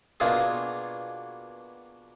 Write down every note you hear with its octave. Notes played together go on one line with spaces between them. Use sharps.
B2 A#3 D4 F4 G#4